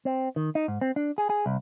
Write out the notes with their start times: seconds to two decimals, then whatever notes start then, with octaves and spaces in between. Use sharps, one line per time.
0.05 C4
0.36 D#3
0.55 D#4
0.68 G#2
0.81 C4
0.96 D4
1.18 G#4
1.30 G#4
1.46 C2